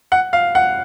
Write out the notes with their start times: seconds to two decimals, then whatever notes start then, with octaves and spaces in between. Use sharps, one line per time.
0.12 F#5
0.33 F5
0.55 F#5